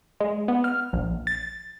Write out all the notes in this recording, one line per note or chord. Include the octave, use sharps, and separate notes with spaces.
G#3
B3
F6
A#1
A6